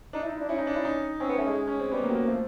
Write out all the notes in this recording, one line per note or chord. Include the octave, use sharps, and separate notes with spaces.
D4 D#4
E4
D#4
E4
D4
C#4 E4
D#4
D4
E4
D#4
C4 C#4
B3
A3 C#4
G#3
C#4
C4
G3 B3
A#3
F#3
A#3
F3 A3